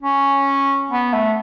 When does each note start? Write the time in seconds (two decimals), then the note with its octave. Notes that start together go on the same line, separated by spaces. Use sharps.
0.02 C#4
0.91 B3
1.14 A3